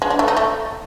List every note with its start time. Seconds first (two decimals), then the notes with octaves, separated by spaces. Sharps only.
0.02 G#3
0.10 D4
0.19 A3
0.28 D#4
0.37 A3